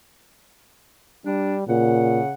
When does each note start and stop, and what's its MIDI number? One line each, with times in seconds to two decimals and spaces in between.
1.26 1.65 55
1.26 1.55 62
1.68 2.21 46
1.68 2.34 49
1.68 2.34 78